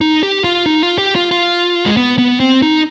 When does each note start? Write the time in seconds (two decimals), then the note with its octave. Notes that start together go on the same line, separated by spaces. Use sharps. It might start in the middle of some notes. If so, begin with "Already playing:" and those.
0.01 D#4
0.23 G4
0.44 F4
0.66 D#4
0.83 F4
0.98 G4
1.15 F4
1.31 F4
1.86 G#3
1.97 B3
2.18 B3
2.40 C4
2.62 D#4